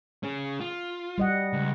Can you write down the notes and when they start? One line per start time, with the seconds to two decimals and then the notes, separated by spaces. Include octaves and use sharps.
0.23 C#4 G#4
0.60 F4
1.18 G3 D#5 F#5
1.53 C#2